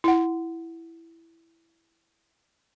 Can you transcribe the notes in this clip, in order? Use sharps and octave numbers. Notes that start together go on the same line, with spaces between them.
E4 F#5